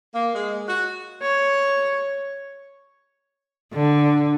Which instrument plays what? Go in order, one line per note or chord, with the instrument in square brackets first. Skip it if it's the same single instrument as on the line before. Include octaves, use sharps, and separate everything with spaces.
[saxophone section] A#3
G#3
F#4
[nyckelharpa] C#5
[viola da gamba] D3